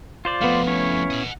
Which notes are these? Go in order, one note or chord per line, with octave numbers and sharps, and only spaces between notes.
F4 C5 D5
F2 A3 B3 F5
C#4 E4 C#5
D#5 F#5